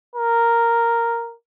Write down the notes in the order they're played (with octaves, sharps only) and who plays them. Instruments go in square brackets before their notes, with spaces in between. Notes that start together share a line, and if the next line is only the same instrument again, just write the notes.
[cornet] A#4